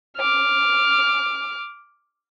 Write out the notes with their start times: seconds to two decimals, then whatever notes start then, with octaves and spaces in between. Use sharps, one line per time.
0.17 D6 F6